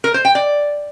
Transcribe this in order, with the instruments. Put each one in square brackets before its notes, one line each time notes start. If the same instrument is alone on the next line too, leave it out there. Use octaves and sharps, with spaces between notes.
[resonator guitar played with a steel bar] A#4
C5
G5
D5